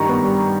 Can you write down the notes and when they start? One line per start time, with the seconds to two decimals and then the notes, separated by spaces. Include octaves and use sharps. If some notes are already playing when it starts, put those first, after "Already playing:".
Already playing: G2 D#3 G3 A#5 C#6
0.09 B3
0.24 G3